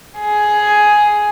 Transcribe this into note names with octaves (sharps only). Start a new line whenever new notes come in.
G#4